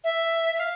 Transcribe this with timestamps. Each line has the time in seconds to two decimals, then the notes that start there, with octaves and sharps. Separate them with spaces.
0.04 E5
0.55 E5
0.60 F5